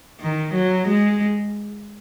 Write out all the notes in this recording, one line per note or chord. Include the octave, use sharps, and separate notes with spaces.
D#3
F#3
G#3